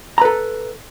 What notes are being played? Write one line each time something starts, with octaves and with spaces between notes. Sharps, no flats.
A4 B4 A#5